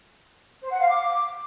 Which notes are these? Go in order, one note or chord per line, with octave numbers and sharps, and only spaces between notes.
C5
F#5
F5
D6